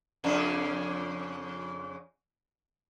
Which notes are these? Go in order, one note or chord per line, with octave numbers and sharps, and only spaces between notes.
F2 C#3 D4